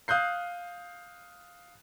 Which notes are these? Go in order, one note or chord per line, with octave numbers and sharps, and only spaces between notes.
F5 D#6 F#6 G6 C7